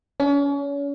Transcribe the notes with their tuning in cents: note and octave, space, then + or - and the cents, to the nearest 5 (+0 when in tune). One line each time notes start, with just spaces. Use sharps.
C#4 +35